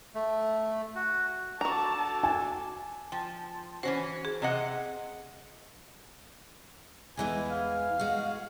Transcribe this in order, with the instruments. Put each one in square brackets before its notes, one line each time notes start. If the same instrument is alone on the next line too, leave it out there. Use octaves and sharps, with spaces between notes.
[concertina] A3
F#4
[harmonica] D3 A4 D6 [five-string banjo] F#4 A#5 [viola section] A5
[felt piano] G#5
[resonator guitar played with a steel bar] F3 [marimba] G5
[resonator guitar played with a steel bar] E3 C#4 F#4 [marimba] C5
[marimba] G#4
[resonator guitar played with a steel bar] C3 D#5 F#5
[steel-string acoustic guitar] E2 E3 G#3 [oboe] G#5
[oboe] F5
[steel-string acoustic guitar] G#3 F#4